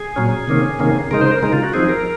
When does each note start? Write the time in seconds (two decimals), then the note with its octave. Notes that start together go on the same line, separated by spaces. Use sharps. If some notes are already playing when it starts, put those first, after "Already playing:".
Already playing: G#4
0.16 A#2 F#3 C#4
0.48 C3 D#3 A#3 C#4
0.79 C3 D#3 A#3 C#4
1.11 C#3 G#3 D#4 A#4
1.21 C5
1.31 A#4
1.42 C#3 G#3 D#4 A#4
1.53 F4
1.63 F#4
1.73 F3 C4 D#4 G#4
1.89 A#4